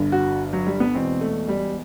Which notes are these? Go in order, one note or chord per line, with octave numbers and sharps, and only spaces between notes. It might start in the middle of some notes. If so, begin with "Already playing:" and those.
Already playing: G1 G2 D3
F#4
F#3
G3
B3
E1 E2 B2 C4
A3
G3